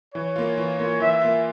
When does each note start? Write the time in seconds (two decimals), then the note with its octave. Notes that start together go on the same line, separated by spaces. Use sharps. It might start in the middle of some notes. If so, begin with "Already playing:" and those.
0.15 E3 C#5
0.36 A#3 F4
0.57 E3
0.79 A#3 F4
1.00 E3 E5
1.22 A#3 F4